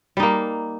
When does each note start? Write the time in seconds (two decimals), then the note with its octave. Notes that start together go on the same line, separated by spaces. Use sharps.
0.17 G3
0.20 D#4
0.23 A#3